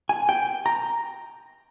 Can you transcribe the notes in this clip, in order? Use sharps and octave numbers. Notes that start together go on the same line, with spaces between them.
G#5
G5
A#5